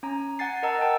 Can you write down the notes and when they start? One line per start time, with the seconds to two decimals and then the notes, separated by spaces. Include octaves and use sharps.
0.03 C#4 G#5 A#5
0.39 F#5 G#5 A6 C7
0.63 A#4 D#5 F#5 A5 A#5 E6
0.80 A#4 G5 A5 E6